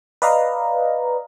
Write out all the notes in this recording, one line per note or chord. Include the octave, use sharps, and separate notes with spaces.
B4 D5 D#5 F5 A#5